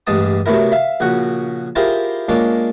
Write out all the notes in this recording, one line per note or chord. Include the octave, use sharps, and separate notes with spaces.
A1 G2 G#3 A5 D#6
C3 F#3 A3 B3 E4 A#4
E5 F5
A#1 C#3 F#4 F#5
E4 F4 G4 G#4 A#4 C5
G#3 A#3 C#4 D4 F4